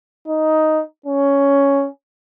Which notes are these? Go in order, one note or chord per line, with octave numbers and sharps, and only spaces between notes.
D#4
C#4